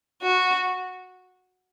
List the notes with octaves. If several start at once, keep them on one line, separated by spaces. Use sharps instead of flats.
F#4